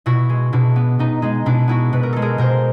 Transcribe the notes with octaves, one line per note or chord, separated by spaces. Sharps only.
B2 E4 F#4
G#3
B2 D4 E4
B3
B2 D#4
G#3 D#4
B2 D4 E4
B3 E4 F#4
B2 B4
A#4
G#3 A4
G#4 A#4
B2 A#4 C5